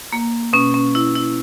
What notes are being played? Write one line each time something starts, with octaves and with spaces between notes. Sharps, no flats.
A#3
B2 C#4
C#4
E4
E4